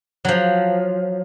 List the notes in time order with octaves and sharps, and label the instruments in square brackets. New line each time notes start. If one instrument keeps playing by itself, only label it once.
[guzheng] F3 F#3